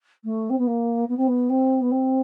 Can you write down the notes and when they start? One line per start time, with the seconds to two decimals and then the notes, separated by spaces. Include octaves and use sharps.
0.24 A3
0.50 C4
0.58 B3
0.67 A#3
1.09 B3
1.17 C4
1.27 B3
1.49 C4
1.81 B3
1.91 C4